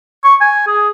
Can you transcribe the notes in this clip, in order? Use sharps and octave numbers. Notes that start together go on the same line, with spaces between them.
C#6
G#5
G#4